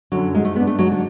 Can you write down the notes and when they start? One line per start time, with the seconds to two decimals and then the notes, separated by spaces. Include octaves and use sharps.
0.12 F#2 D3 F#3
0.34 G#2 G#3
0.45 A3
0.56 G#3 B3 D4
0.67 A3
0.79 G#2 F#3
0.91 D3